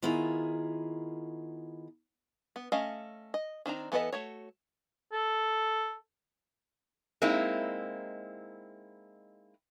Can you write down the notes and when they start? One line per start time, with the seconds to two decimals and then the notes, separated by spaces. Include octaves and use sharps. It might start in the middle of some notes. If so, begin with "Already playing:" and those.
0.02 D#3 B3 E4 F4 G#4 A#5
2.56 B3
2.72 A3 C#4 D#5 F5
3.34 D#5
3.66 D#3 C4 D4 A#5
3.92 E3 B3 A4 B4 D#5
4.13 A3 F#4 C#5
5.13 A4
7.22 G#3 A#3 C4 D#4 E4